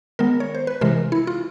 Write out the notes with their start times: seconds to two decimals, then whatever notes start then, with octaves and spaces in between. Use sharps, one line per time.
0.19 D#3 G#3 B3 A#4
0.40 C#5
0.55 C5
0.67 B4
0.81 C3 E3 G#3 A#4
1.12 E4
1.27 F4